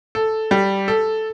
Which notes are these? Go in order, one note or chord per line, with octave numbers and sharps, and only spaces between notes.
A4
G3
A4